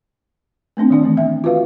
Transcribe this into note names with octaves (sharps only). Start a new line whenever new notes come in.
A3 B3 C4 D4
D#3 D4 D5
E3 A3
B3 E5
F4 F#4 B4 F5